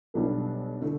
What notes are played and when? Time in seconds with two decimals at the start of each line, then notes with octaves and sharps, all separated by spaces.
0.14 B1 B2 G3 D4 A4
0.81 D3 A3